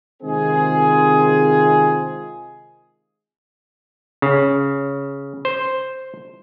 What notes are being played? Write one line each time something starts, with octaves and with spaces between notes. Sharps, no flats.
C3 D#3 G#3 C4 F4 G#4
C#3
C5